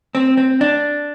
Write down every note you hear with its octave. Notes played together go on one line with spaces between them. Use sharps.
C4
C4
D4